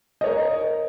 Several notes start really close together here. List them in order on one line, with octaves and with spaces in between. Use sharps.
D#5 C#5 A#4